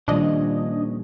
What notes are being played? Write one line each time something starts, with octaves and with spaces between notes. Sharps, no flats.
D#2 A#2 D#3 F3 G3 C#4 D4 D#5